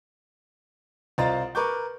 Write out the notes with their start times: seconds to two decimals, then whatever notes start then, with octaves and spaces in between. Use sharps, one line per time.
1.18 C2 F4 C5 D#5 A#5 A6
1.55 A#4 B4 C#6 D6 G6